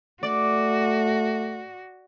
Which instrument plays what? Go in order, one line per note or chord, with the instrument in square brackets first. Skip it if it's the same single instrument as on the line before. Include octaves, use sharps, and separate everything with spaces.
[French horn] A3 [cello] F#4 [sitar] D5